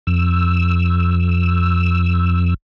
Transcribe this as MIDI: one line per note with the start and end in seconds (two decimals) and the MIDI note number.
0.07 2.54 41
0.07 2.54 88